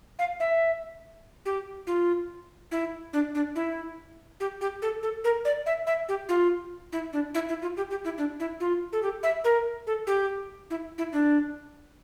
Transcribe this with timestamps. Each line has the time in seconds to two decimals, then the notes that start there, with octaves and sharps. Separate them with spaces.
0.19 F5
0.40 E5
1.46 G4
1.87 F4
2.71 E4
3.13 D4
3.35 D4
3.56 E4
4.40 G4
4.61 G4
4.82 A4
5.03 A4
5.24 A#4
5.45 D5
5.66 E5
5.87 E5
6.09 G4
6.29 F4
6.92 E4
7.13 D4
7.34 E4
7.49 E4
7.62 F4
7.77 G4
7.91 G4
8.04 E4
8.18 D4
8.40 E4
8.60 F4
8.93 A4
9.03 G4
9.23 E5
9.44 A#4
9.87 A4
10.07 G4
10.70 E4
10.98 E4
11.13 D4